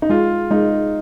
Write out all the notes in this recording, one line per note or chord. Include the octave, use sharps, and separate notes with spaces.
D#4
G#3 F4
G#3 D#4